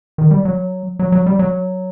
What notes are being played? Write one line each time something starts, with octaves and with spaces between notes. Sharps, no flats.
D#3
G3
F#3
F#3
F#3
G3
F#3